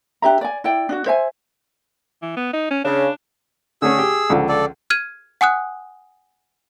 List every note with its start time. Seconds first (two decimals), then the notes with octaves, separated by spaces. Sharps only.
0.22 D4 G4 E5 A#5
0.41 D5 G#5
0.64 E4 D5 G5
0.89 D4 F4 F#4
1.06 C5 E5 G#5
2.22 E3
2.37 B3
2.53 D#4
2.71 C#4
2.85 C#3 D4
3.82 D3 A3 C#4 G#4 E6
3.98 G4
4.30 C#2 D3 F3
4.49 A4 D5
4.90 F6 G#6 D#7
5.41 F#5 G#5 D#6 F#6